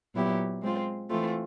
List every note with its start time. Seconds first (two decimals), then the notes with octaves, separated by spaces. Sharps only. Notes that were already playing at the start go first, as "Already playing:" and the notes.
0.14 A#2 F#3 B3 E4 G4
0.62 G#3 C4 F4
1.10 E3 A3 C4 F4